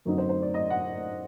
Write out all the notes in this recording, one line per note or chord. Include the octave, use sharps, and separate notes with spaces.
F#2 D3 F#3 C4 D#4
C5
C5
D5
D#5
F#5